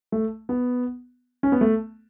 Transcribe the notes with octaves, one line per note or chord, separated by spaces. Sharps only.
A3
B3
C#4
B3
A3